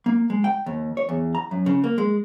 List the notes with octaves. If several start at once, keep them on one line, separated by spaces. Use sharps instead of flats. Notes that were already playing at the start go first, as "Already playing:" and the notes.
A#3
G#3
G5
D#2
C#5
E2
A#5
F#2
C#3
A#3
G#3